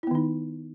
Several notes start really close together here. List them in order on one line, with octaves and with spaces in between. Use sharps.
E4 B3 D#3 D#4